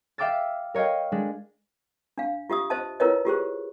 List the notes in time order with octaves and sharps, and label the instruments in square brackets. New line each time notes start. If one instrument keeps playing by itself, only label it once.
[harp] E5 F5 G5 D6 E6 A6
A#4 C#5 D#5 F5 G5
G#3 D4
[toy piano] D4 F5
F4 G4 E5 D#6
C5 D#5 E5 A5
E4 F4 A#4 B4 C#5 D#5
F4 G4 G#4 C5